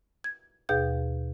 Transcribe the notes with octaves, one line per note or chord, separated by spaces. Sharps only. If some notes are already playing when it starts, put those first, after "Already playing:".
G#6
D#2 B2 G#4 F5 G6